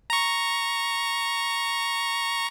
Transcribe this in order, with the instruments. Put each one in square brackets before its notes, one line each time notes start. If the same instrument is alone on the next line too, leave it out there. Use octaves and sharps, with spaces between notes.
[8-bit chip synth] A#5 C#6